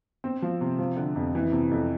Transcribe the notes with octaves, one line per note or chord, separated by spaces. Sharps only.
C4
F3
C3
F3
D3
F2
E3
C3
F2